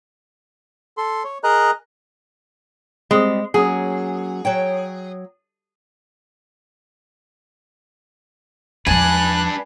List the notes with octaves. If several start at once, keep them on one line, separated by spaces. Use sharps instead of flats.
A4 C6
C#5
G#4 A#4 D#5 A#5 F#6
G3 G#3 C4
F#3 A#3 C#4 G#4
F#3 C#5 G5
E2 F3 D4 B4 G#5 F#6